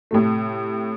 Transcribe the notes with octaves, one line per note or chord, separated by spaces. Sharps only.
A2 C3 A3